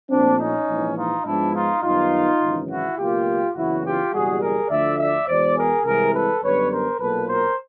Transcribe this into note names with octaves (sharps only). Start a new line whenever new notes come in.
A#1 A#2 F3 A3 C4 D4
C#4 D#4
A#1 G#2 E3
D#4 F4
G#2 F3 G#3 B3 D4 E4
D#4 F4
F#2 D#3 G3 B3 D#4 F4
G#1 F#2 C#3 E3
E4 F#4
C#2 B2 F#3 A#3 F4 G4
F#1 E2 C#3 E3 E4 F#4
F4 G4
F#1 E2 B2 G3 F#4 G#4
G#4 A#4
D2 D3 F3 A3 D5 E5
D5 E5
E2 B2 G#3 C5 D5
G#4 A#4
C2 C3 E3 G#3 G#4 A#4
A4 B4
F#2 D3 G3 B3 B4 C#5
A#4 C5
B1 A#2 F#3 A#3 A4 B4
A#4 C5